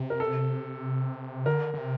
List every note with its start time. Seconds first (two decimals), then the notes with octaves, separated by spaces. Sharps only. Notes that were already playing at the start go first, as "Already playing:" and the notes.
Already playing: C3
0.10 A#4
0.20 A4
1.46 D3 A#4
1.74 D3
1.78 C3